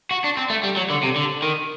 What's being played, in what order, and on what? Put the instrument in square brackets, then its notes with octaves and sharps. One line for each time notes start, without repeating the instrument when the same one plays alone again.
[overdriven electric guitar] F#4
D4
C4
A3
G3
F#3
D3
C3
D3
D#3